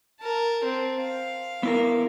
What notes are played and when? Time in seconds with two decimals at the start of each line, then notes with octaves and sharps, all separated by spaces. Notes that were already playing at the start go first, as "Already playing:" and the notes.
0.21 A#4 A5
0.65 C4
1.00 F5
1.63 B3 E4 A#4